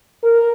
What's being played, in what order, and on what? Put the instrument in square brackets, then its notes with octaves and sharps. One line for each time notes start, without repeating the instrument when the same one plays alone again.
[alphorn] A#4